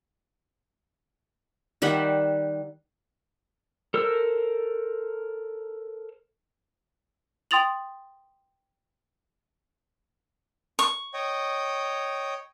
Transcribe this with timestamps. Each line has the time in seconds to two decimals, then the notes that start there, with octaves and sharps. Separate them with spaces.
1.82 D#3 G3 E5 F#5
3.94 A4 A#4 C5 E6
7.51 G5 C6 D#6 A6 F7 F#7
10.79 C#6
11.14 C#5 D#5 G5